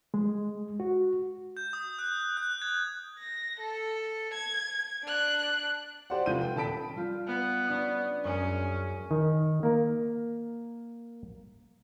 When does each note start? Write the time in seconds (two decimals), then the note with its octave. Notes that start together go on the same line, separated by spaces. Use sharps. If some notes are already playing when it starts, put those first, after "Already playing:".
0.14 G#3
0.80 F#4
1.57 G6
1.73 D#6
1.99 F#6
2.37 F#6
2.62 G#6
3.19 A#6
3.60 A4
4.34 G#6
5.04 D4 F#6
6.10 G4 C5 D5 F#5
6.26 F1 F4 G6 D#7
6.41 G5
6.56 D#1 A4 A5 B5 B6 D7
6.96 G3 F4 G4
7.27 B3
7.67 C#4 D4 D#6
8.24 F#2 G#3 C#4 D#6
9.11 D#3
9.63 A#3 A#4